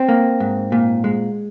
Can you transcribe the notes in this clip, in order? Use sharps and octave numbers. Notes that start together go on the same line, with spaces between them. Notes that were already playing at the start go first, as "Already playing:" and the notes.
Already playing: C4
A#3
G#2
A#2
G#3